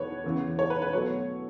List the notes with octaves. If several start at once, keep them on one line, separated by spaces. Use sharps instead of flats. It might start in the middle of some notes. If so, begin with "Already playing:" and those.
Already playing: E2 B2 B4 C#5
E2 C#3 E3 B3
C#5
B4
B4
B2 F#3 A3 C#5